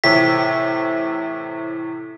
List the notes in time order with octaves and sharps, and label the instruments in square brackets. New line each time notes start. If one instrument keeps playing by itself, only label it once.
[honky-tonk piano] A2 C3 E3 [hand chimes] C#5 E5 G5 [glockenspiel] B6